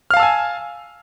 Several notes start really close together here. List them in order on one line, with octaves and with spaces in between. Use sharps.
F6 F5 A5 E6 G#5